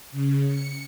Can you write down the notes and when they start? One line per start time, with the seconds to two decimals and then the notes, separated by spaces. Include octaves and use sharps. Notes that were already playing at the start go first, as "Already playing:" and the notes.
0.12 C#3
0.47 C#7